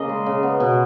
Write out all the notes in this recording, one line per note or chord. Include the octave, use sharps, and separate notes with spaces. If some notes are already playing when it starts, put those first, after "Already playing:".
Already playing: C#3 A#3 C#4 D#5
G#3
C#3
B3
B2